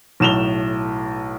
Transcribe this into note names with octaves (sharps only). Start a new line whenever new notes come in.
B1 A2 E7 F7 G7